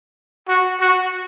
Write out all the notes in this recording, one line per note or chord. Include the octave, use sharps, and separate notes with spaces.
F#4
F#4